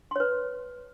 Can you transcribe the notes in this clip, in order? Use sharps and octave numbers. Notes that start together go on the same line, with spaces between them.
B4 C#5 C6